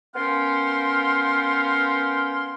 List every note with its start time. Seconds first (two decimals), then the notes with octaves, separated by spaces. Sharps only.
0.15 B3 C#4 A#4 F5 G5 C6